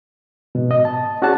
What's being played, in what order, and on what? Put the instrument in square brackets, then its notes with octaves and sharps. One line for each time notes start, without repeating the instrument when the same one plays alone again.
[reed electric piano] G#2 B2
D#5
A5
C#4 F#4 G#4 D5 F#5 A5